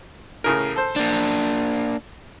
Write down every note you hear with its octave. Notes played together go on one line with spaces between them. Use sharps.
A2 C#3 A#4
A4 C5
A#3 D4